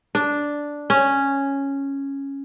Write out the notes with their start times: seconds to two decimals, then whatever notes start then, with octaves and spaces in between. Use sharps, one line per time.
0.15 D4
0.90 C#4